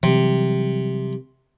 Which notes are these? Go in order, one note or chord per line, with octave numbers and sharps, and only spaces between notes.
C3 E3 F#3 G3